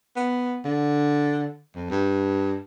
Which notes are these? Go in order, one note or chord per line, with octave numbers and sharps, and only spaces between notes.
B3
D3
F2
G2